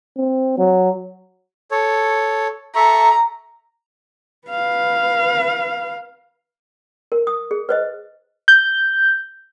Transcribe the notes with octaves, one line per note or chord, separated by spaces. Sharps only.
C4
F#3
A4 C#5
A4 E5 A#5 C#6
B4 F5
A#4
D#6
G#4
B4 C5 D#5
G6